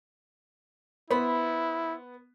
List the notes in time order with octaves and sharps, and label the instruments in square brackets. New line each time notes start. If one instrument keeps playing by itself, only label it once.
[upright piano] B3 [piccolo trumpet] E4 [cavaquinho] C5 B5